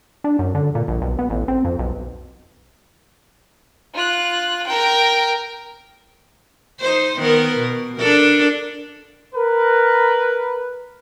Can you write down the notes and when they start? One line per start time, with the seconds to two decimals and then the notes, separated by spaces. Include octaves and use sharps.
0.24 D4
0.39 F#2
0.55 D3
0.75 A#2
0.88 A#1
1.02 B1
1.19 B3
1.30 A1
1.48 C4
1.65 F2
1.79 B1
3.94 F4 F#6
4.66 A#4 G5
6.80 D#4 C5
7.19 D#3 B3 A#4
7.58 B2
7.97 D4 A4 A#4
9.35 A#4 B4